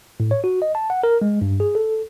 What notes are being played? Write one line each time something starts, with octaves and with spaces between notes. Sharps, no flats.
A2
C#5
F#4
D#5
A5
F#5
A#4
G#3
G2
G#4
A4